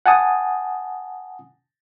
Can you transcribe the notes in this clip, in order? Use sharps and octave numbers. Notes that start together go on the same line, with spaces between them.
F#5 G#5 A5 D#6